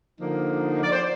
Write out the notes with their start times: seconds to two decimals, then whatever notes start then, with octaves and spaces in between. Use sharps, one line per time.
0.20 D3 F3 A#3 D#4
0.84 D5
0.92 C5